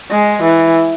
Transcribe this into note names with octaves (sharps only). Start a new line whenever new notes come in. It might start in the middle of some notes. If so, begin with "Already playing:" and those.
G#3
E3